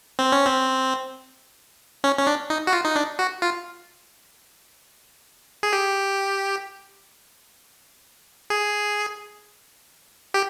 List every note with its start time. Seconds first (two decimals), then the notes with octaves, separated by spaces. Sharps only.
0.19 C4
0.32 C#4
0.46 C4
2.04 C#4
2.19 C#4
2.27 D4
2.50 D#4
2.67 F#4
2.73 F4
2.85 D#4
2.96 D4
3.19 F#4
3.42 F4
5.63 G#4
5.73 G4
8.50 G#4
10.34 G4